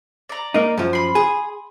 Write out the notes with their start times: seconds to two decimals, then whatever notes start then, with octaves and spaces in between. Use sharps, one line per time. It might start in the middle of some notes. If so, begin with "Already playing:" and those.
0.29 D5 A#5
0.54 A#3 D#4
0.78 F#2 F3
0.93 B5 C6
1.15 G#4